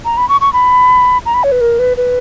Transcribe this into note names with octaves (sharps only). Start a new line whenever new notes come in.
A#5
B5
C#6
C#6
B5
A#5
B5
C#5
B4
A#4
B4
B4